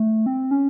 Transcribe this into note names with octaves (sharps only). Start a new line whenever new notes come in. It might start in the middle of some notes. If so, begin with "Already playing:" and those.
Already playing: A3
C4
C#4